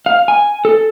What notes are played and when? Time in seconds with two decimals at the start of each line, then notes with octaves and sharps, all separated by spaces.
0.06 F5
0.28 G#5
0.65 A4